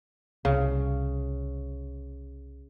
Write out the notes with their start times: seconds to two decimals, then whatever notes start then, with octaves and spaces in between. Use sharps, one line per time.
0.45 C2 C#3